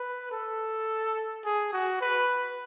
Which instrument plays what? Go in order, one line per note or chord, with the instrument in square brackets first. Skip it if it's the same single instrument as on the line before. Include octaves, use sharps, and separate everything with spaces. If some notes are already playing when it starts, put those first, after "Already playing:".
Already playing: [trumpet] B4
A4
G#4
F#4
B4